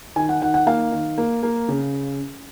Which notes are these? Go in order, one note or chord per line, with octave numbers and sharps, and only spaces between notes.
D#3 G#5
F#5
D#3 F#5
F#5
A#3 F5
D#3
A#3
A#3
C#3